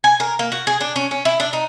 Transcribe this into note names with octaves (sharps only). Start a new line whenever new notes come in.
G#5
A#4
A#3
F#4
G#4
D4
C#4
C#4
E4
D4
D#4